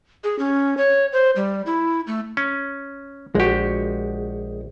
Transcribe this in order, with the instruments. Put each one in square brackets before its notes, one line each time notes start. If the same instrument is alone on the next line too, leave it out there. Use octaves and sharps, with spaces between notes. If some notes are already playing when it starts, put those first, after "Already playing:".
[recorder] G#4
C#4
C#5
C5
G3
E4
A3
[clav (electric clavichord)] C#4
[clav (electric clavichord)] A#1 G4 [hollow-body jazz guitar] G#3 F#4